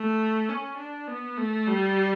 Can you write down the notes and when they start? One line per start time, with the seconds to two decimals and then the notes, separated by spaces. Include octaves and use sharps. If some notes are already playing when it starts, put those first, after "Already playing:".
Already playing: A3
0.49 C#4
0.78 D4
1.07 B3
1.37 A3
1.67 G3